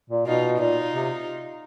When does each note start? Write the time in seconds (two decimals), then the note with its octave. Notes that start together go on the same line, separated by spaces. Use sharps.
0.10 A#2
0.26 B2 D#4 F4
0.59 A#2 D#4 F4
0.92 C3